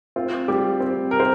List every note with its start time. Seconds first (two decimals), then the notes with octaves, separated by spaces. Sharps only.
0.16 C4 F4
0.48 G3 G4
0.80 C4
1.11 A#4
1.20 C5